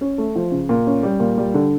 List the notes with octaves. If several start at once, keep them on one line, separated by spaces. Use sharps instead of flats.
C#4
A3
F3
C#3
A#2
C#4
G3
A#2
G3
D3